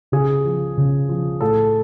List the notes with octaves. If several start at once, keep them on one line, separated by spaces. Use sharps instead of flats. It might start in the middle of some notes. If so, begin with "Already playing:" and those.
C#3 G#4
F3
C#3
F3
A2 A4